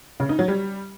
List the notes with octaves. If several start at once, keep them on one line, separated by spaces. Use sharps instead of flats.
C#3
D#4
F#3
G3